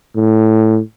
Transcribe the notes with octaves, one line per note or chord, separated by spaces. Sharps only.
A2